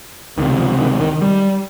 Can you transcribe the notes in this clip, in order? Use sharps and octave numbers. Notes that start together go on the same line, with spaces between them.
C#2 C3 D#3
F3
D#3
D#3
G3